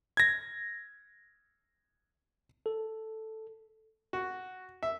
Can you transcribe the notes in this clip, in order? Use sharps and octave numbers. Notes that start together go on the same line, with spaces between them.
G#6 A#6
A4
F#4
E5